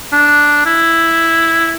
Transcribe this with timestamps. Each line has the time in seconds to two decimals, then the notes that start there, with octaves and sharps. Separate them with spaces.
0.12 D4
0.66 E4